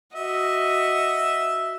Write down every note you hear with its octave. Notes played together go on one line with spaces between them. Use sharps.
F#4 D#5 E5